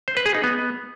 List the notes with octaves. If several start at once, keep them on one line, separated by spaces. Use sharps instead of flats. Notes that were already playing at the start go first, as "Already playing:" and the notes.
C5
B4
G#4
D#4
B3